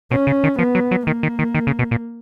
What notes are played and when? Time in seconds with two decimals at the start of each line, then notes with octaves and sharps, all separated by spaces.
0.11 B2 C#4
0.27 C#3
0.44 D#3
0.59 F3 B3
0.75 F#3
0.91 F#3
1.07 D#3 A#3
1.23 D#3
1.39 D#3
1.55 D#3
1.67 C#3
1.79 B2
1.91 A#2